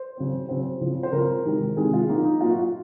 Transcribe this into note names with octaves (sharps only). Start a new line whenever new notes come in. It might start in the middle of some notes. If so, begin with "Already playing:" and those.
Already playing: C5
C#3 F#3 C4
C#3 F#3 C4 C5
C#3 F3 C4
C5
C#3 F3 C4 A#4
C3 D#3 G#3 C4
C3 D#3 G#3 C4 G#4
F4
A#2 F#3 A#3 D#4
D#4
A#2 F#3 A#3 F4
F#4
F4